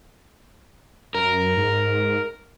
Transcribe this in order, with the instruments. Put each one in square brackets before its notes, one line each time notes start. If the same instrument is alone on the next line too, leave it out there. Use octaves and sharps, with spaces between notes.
[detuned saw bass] F#2 [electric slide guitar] A#4
[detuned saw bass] G#2